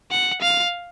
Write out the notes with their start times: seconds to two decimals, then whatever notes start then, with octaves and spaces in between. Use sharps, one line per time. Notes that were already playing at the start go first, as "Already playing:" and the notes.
0.11 F#5
0.41 F5